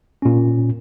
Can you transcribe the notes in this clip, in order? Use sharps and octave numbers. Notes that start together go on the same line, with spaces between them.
A#2 C#4